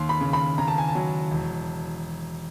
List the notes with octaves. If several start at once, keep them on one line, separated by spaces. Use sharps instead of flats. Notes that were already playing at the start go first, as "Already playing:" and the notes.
Already playing: D#2 C6
B5
C#3
B5
C#3 A#5
A5
G#5
A5
F#3
E1